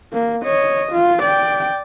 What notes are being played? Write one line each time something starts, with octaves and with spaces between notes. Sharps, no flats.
A#3
C#5 D#5
F4
D5 G5